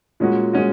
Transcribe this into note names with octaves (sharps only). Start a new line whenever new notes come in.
A#2 G#3 C#4 F#4
A#2 G#3 C#4 F#4